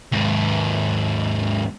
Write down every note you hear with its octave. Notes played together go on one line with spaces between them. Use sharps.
D#2 G#2